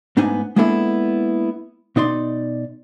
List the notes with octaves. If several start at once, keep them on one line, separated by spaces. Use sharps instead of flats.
G#2 A3 B3 D4 D#4 G#5
G#3 A#3 B3 D4 E4 A4
B2 D#4 D5 C6